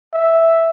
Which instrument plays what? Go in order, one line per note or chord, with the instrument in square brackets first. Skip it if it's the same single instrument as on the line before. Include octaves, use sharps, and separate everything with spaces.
[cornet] E5